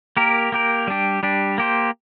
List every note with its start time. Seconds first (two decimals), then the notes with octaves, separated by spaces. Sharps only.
0.17 A#3 G4 A#4
0.52 A#3 G4 A#4
0.87 G3 D4 G4
1.23 G3 D4 G4
1.58 A#3 G4 C5